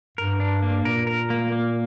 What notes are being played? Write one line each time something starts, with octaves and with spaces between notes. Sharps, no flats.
G2 A#4
D4
A#3
A#2 A#4
A#4
A#3
A#3